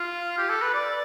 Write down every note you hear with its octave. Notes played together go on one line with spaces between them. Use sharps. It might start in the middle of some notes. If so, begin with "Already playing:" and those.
Already playing: F4
G4
A4
B4
D5